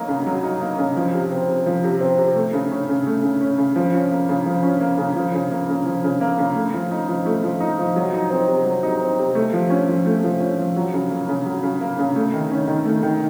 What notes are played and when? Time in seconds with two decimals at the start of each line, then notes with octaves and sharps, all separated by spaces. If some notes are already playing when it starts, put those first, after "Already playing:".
Already playing: F#3 A#3 D#4
0.08 C#3
0.27 F#3
0.43 D#4
0.61 A#3
0.78 C#3
0.97 F3
1.14 C3
1.31 C4
1.48 C3
1.66 F3
1.84 C3
2.01 C4
2.18 C3
2.36 A3
2.53 C#3
2.72 C#4
2.89 C#3
3.07 A3
3.23 C#3
3.41 C#4
3.58 C#3
3.76 F3
3.94 C#4
4.11 A#3
4.29 C#3
4.46 F3
4.63 C#4
4.80 A#3
4.98 C#3
5.16 F3
5.34 C#3
5.51 A#3
5.69 C#3
5.86 F3
6.04 C#3
6.21 A#3
6.38 C#3
6.55 A3
6.74 F3
6.91 D#4
7.08 F3
7.26 A3
7.44 F3
7.60 D#4
7.79 F3
7.96 F#3
8.14 D#4
8.30 C4
8.48 C3
8.66 F#3
8.83 D#4
9.01 C4
9.19 C3
9.35 A3
9.53 F3
9.70 C#4
9.88 F3
10.06 A3
10.24 F3
10.40 C#4
10.58 F3
10.76 F#3
10.94 C#3
11.11 A#3
11.29 C#3
11.46 F#3
11.63 C#3
11.81 A#3
11.99 C#3
12.16 A3
12.34 D#3
12.51 C#4
12.68 D#3
12.85 A3
13.03 D#3